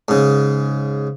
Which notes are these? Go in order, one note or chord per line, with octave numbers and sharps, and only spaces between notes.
G#2 C#3